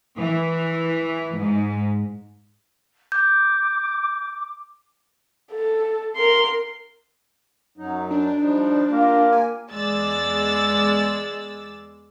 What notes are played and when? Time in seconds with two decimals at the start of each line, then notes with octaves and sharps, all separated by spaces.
0.17 E3
1.37 G#2
3.12 D6 G6
5.52 A4
6.16 A#4 C6
7.78 F#2 F#3 D#4
8.11 D4
8.40 F3 G3 D#4
8.91 A#3 F4 G4 A#4
9.32 G#5
9.70 E2 G#3 D5 E6 A6